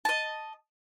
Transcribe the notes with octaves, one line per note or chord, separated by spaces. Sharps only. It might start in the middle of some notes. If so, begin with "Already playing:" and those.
D#5 A5